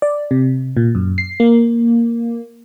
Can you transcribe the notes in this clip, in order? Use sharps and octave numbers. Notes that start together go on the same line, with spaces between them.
D5
C3
A#2
F#2
C7
A#3